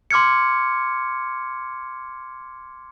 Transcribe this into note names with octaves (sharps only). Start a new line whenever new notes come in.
C6 D6 F6 G#6 C#7